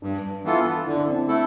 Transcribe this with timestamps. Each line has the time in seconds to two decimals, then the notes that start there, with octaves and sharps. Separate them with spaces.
0.02 G2 D4
0.45 E3 B3 F4 A4
0.86 D3 E4
0.97 D4
1.07 C4
1.16 D4
1.29 A3 E4 A4